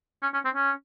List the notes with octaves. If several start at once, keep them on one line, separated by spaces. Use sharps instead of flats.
C#4
C#4
C4
C#4